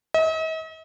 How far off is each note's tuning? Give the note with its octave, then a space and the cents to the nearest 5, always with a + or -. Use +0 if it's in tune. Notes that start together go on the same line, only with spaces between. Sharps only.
D#5 +45